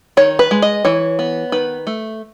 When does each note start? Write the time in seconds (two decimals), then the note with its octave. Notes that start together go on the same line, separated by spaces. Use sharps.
0.17 D#3 C#5
0.39 B4
0.51 G#3
0.62 D#5
0.85 E3 C#5
1.19 B3
1.52 D#3 B4
1.87 A3